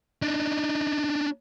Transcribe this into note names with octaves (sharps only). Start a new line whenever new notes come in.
D4 D#4